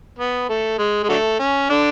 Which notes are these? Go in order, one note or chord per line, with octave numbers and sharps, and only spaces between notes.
B3
A3
G#3
G#3
D3 F#3 A3
C#4
D3 D4